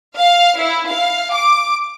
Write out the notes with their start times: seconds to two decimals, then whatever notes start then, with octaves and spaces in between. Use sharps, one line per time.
0.16 F5
0.59 E4
0.90 F5
1.32 D6